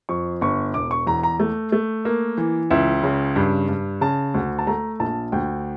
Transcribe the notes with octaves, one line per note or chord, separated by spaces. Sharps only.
F2 C#6
G1 C#6
E1 D6
C#6
E2 A#5
A#5
A3
A3
A#3
E3
C#2 E5
C#3
G2
G2
C#3 A5
D2
A5
A3 A#5
A#1 A5
D2 G5